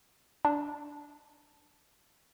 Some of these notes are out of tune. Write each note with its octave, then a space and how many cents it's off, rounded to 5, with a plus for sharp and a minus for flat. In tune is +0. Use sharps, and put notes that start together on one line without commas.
D4 -5